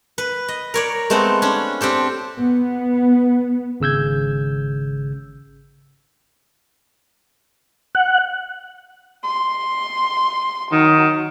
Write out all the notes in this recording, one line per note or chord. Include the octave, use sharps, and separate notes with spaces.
B4
D#5
A#4 C#5 D5
G#3 A3 B3 C4 A4
C#4 D4
C4 D4 G4 A4
B3
G#1 C#3 E6 G6 G#6
F#5
C6
D#3 F#3